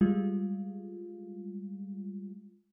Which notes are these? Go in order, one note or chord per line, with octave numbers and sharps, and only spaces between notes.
G3 G#3 F4